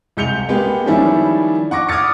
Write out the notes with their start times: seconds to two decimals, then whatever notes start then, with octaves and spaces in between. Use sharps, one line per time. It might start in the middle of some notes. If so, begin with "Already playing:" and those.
0.17 C2 G#3 G6 C#7 F7 G7
0.49 G#3 A#3 B3 G4
0.86 D#3 F3 G3 C#4 D4 E4
1.71 F#5 C#6 D6 A#6
1.89 D6 D#6 F6 G#6 A6 C#7